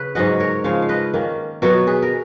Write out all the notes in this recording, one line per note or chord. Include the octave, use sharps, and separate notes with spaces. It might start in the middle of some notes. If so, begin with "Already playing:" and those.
Already playing: C#3 B4 C#5
G#2 F#3 C#4 D#5 F#5
A#4 C#5
C#3 F3 G#3 C#5 F5
F5
B4 D#5
D#3 A#3 C#4
B2 F#3 B3 A#4 C#5
G#4 B4
A#4